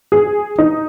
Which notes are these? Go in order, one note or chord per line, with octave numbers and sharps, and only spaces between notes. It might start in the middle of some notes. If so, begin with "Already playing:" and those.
G#4
D#4